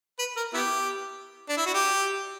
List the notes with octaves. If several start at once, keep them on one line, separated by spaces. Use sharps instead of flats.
B4
A#4
B3 E4 G4
D4
E4
F#4
G4